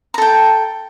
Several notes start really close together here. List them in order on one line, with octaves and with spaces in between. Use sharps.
A#5 A4 G5